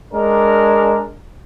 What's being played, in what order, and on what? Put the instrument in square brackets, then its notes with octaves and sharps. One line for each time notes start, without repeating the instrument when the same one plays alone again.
[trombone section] G#3 D4 A#4